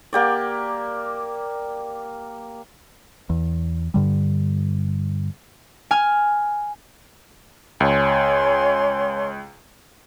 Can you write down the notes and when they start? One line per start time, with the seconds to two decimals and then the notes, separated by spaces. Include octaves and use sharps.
0.13 A#3 G4 D5
3.30 E2
3.94 G2 D3 G3
5.91 G#5 F6
7.80 C#2 C#5 G#5 C6